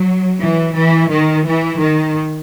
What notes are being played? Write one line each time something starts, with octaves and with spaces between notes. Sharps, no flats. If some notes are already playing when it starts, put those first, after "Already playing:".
Already playing: F#3
E3
E3
D#3
E3
D#3